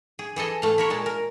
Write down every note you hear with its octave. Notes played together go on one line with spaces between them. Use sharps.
G#4
E3 G#4 A4 D#5
A2 A3 F5
E4 A#4 C#5
A#2 G#3 A5
A#4